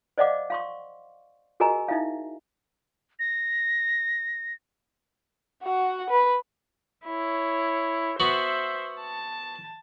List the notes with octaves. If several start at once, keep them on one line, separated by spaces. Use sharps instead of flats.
C5 D5 D#5 F5 F#5 D6
F5 C6 C#6
F#4 G#4 A#4 D#5 G#5 A#5
D#4 E4 E5 F5
A#6
F#4 F#5
B4
E4 C#5
B3 F#4 C5 E5
A5